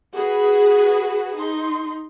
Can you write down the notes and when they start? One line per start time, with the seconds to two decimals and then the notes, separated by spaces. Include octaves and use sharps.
0.14 F#4 G#4 B4
1.36 D#4 C6